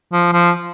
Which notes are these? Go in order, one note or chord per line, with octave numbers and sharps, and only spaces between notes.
F3
F3